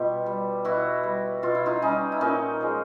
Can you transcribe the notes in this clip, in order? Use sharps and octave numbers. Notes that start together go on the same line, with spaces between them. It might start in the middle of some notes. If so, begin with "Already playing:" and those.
Already playing: B2 G3 F4 G4
G3
B2 E4 F#4
G3
B2 F4
E4
D#4 F4
G3 C#4 D#4
E4
A#2 C#4 D#4
F3 G#3